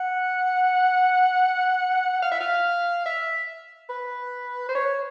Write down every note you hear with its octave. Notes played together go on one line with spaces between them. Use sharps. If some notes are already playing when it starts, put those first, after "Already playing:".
Already playing: F#5
F5
E5
F5
E5
B4
C5
C#5